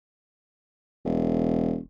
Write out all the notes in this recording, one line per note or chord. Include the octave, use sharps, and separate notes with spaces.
E1